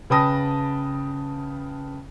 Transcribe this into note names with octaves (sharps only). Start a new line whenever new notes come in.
C#3 B4 G5 A5 D#6 A#6